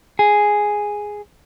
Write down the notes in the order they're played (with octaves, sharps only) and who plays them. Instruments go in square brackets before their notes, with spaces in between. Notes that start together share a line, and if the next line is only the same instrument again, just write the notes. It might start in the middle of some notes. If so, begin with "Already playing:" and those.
[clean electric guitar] G#4